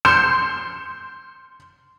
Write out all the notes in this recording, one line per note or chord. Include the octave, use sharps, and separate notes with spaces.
C6 G6 C#7 E7